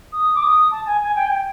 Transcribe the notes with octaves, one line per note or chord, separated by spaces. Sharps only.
D#6
D6
D#6
A5
G#5
G#5
G5
G#5
G5